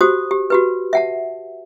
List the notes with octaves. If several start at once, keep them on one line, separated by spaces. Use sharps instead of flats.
F#4 G4 C5 D#6
G4
F#4 G4 B4
E5 F#5 A5